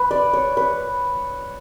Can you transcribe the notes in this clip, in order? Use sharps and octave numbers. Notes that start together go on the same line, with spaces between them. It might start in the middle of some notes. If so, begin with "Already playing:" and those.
Already playing: B4
D5
C#5
B4